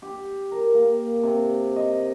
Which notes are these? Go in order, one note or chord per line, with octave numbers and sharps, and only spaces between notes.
G4
A#4
A#3
C3
D#5